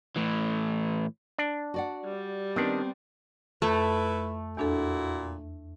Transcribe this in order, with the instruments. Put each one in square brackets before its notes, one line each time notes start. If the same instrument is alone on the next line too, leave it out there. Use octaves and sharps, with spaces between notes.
[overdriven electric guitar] A2 E3
[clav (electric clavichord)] D4
[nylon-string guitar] F#4 D5 F#5
[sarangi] G3
[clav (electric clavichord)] D#3 D4 [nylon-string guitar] B3 C4
[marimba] F2 [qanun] A3 [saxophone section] E4 A4 B4
[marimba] E2 D4 A4 [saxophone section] A#2 E4 F#4